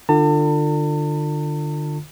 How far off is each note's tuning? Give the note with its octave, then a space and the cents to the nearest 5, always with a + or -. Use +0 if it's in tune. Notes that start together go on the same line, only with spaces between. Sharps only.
D3 +30 F4 +0 A5 +40